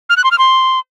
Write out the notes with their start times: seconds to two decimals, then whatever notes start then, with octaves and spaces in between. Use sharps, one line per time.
0.09 F6
0.17 F#6
0.24 C6
0.31 F6
0.38 C6